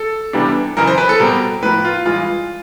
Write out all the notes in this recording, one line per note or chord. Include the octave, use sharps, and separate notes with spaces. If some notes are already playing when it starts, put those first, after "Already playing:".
Already playing: A4
C3 E3 G3 B3 D4
F#2 C#3 E3 A#4
C5
B4
A4
B2 G3 C4 A#4
A2 F3 A#3 B4
F4
G2 E3 G#3 F4